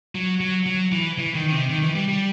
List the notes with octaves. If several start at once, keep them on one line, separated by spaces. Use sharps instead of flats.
F#3
F#3
F#3
E3
E3
D#3
D#3
C3
D#3
E3
G3
G3